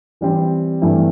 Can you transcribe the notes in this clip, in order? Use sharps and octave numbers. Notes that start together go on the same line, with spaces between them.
E3 G3 C4
G2 E3 A3 C4 E4